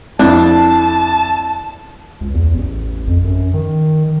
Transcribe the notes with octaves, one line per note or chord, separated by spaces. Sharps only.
F2 D4 E4 A5
C#2
E2
A1
F2
F#2
D#3